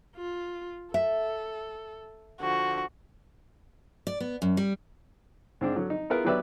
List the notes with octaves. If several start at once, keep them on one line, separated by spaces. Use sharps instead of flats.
F4
A4 E5
D3 F3 F#4
D5
B3
F#2
G3
G#2 C4 D4
D3 F#3
D#4
B3 E4 F4 G#4 A#4 B4
F#3 B3 G4 B4 D5 E5